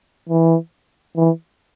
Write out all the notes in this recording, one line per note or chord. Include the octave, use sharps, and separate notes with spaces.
E3
E3